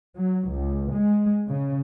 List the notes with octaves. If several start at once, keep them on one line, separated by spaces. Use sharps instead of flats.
F#3
C#2
G#3
C#3